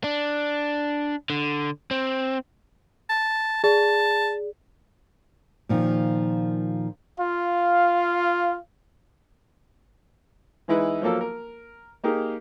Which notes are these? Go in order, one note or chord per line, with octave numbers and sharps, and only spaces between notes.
D4
D3
C4
A5
G#4 D5 A5
A#2 D#3 F3
F4 F5
E3 G#3 D#4 E4 B4
F3 F#3 A#3 A4 A#4
A#4
A#3 D#4 G4 G#4 A#4